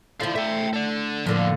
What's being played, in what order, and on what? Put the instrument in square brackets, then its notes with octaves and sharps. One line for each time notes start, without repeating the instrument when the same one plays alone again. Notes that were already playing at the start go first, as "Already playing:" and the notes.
[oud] D3 E4 [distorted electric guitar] C5 F5
[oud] A3 [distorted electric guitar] E5 G5
[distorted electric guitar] A4 D5
[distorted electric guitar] F2 [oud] A2 D3 A#3